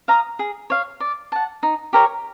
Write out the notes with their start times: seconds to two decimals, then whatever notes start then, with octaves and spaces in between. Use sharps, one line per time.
0.08 F5 A#5 D#6
0.39 G#4
0.70 C#5 F5
1.00 D5
1.32 F#5 A5
1.63 D#4
1.93 G4 A#4 C#5